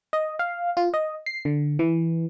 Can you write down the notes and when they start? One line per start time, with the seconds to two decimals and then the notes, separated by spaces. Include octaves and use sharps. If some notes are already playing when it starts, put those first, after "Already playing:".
0.13 D#5
0.39 F5
0.77 F4
0.94 D#5
1.26 C7
1.45 D3
1.79 E3